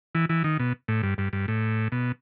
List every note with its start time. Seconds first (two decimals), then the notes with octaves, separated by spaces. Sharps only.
0.15 E3
0.29 E3
0.44 D#3
0.60 B2
0.88 A2
1.03 G2
1.18 G2
1.33 G2
1.48 A2
1.92 B2